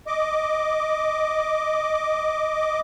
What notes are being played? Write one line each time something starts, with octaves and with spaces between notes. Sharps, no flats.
D#5 D6